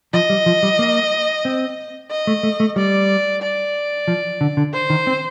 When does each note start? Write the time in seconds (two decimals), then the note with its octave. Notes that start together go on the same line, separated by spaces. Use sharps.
0.13 F3 D#5
0.30 G3
0.46 F3
0.63 G3
0.79 A#3
1.45 C4
2.11 D#5
2.27 A3
2.43 A3
2.60 A3
2.76 G3 D5
3.42 D5
4.08 F3
4.41 D3
4.57 D3
4.73 C5
4.90 D#3
5.07 C4